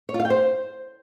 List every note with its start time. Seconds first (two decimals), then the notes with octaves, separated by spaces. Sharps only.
0.09 C#5
0.14 F4
0.20 F5
0.25 G5
0.30 C5